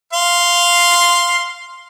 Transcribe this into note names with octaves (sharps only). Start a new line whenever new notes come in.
F5 C6